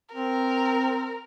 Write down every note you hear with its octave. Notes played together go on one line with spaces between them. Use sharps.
C4 A#4